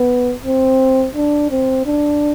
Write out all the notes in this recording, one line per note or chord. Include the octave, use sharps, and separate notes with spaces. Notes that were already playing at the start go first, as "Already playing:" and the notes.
Already playing: B3
C4
D4
C4
D4